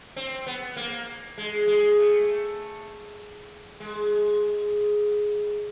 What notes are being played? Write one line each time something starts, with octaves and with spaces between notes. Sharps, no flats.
C4
B3
A#3
G#3
G#3
A3
G#3